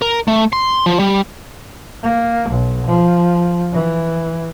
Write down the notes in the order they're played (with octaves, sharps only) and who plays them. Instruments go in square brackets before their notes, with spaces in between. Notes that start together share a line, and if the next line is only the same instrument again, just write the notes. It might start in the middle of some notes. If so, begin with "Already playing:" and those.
[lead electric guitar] A#4
A3
C6
F3
G3
[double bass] A#3
B1
F3
E3